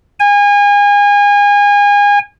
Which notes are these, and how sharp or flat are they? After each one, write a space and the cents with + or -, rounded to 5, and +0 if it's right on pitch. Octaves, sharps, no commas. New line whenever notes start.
G#5 -30